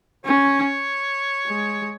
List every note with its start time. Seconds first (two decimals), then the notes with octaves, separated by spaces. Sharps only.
0.25 C#4 C#5
1.47 G#3